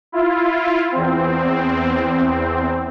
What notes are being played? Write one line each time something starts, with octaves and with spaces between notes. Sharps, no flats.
E4 F4
E2 C4